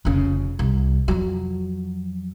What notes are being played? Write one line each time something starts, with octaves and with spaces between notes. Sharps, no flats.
F1 C#3
C2
F2 F#3